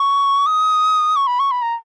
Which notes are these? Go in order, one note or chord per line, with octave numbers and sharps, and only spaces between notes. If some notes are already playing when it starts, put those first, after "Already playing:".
Already playing: C#6
D#6
C#6
B5
C#6
B5
A#5